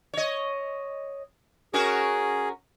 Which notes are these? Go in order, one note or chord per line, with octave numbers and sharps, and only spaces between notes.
C#5 D#5
C#4 F#4 G#4 A#4